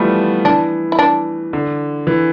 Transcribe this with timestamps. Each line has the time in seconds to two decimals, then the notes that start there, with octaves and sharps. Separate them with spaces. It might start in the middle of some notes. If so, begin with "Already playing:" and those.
Already playing: E3 F3 G3 A3 B3 E4
0.45 E3 D4
0.92 E4
0.99 D4
1.53 D3
2.07 E3